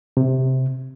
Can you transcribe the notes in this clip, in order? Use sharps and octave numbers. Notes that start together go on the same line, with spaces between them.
C3